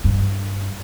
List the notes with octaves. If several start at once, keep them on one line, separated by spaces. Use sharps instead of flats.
G2